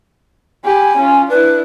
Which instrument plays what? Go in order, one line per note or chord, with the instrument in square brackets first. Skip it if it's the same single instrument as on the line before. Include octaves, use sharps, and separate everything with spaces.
[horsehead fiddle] G4 B5 [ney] G#5
[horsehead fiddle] C#4 F4
[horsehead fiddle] D4 E4 [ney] B4